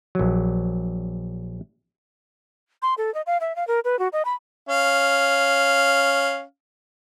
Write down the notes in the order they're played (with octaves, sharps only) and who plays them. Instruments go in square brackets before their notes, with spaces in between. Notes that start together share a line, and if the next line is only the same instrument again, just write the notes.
[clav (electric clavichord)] A#1 F#3
[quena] C6
A4
D#5
F5
E5
F5
A#4
B4
F#4
D#5
B5
[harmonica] C#4 F5